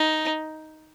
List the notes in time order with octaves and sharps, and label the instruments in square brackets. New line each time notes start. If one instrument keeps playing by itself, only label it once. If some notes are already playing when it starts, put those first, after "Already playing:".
Already playing: [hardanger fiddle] D#4